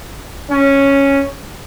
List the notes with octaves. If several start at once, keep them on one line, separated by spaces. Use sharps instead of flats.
C#4